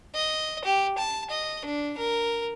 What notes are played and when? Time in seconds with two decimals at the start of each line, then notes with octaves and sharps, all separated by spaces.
0.15 D#5
0.64 G4
0.98 A5
1.30 D#5
1.65 D4
1.97 A#4